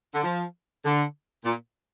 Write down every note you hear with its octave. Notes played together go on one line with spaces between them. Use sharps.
D3
F3
D3
A#2